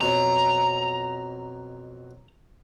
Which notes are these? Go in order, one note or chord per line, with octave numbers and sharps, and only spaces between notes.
F2 B2 F#3 A#5